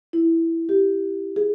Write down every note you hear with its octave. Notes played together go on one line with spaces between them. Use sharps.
E4
G4
G#4